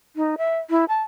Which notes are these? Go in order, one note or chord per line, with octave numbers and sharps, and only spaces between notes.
D#4
E5
E4
A5